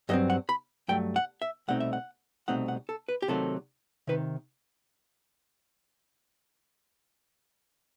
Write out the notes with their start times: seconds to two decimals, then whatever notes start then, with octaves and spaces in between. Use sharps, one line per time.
0.09 G2 F#3 A3 C4 D#5
0.30 F#5
0.49 B5
0.88 G2 F#3 A3 G5
1.16 F#5
1.42 E5
1.68 C2 B2 A3 C4 D#4 F#5
1.80 E5
1.93 F#5
2.48 C2 B2 A3 C4 D#4 F#5
2.68 F#5
2.89 A4
3.09 B4
3.22 G4
3.28 C3 D#3 F#3 A3 A4
4.07 C3 D#3 B4